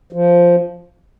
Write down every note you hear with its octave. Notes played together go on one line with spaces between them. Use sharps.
F3